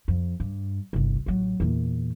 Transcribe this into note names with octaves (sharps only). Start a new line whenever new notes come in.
F2
G2
G1 C2
A1 F#3
E2 A#2